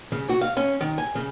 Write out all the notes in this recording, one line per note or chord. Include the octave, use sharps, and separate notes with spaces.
C#3
F#4
F5
C#4
D#3
G#5
C#3